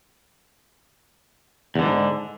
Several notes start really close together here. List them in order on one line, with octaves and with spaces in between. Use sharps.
E2 D3 G#2